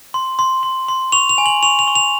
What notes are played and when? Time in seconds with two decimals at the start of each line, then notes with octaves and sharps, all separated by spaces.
0.14 C6
0.39 C6
0.63 C6
0.88 C6
1.12 C#6 F7
1.29 F7
1.38 G#5
1.46 F#7
1.63 C#6 F7
1.79 F7
1.87 C#6
1.95 F7